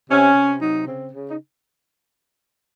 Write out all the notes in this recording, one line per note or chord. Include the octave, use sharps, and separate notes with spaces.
C3 C#4
C3
F#3 D#4
C#3 C4
C#3
D#4